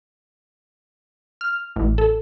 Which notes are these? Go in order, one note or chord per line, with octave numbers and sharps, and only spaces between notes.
F6
A1
A4